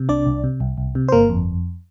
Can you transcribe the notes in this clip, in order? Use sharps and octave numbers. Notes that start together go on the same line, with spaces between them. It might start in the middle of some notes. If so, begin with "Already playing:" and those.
Already playing: C3
C2 D4 D5
C2
C3
C2
C2
C3
C5
G1 A#3 A#4
F2